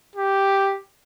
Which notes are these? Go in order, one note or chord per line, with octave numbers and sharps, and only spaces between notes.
G4